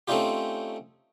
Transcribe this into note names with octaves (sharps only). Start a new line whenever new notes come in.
A3 C4 C#4 D#4 F4 G4